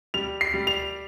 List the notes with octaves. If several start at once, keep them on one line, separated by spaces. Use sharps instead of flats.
G3 F7
C7
G3
F7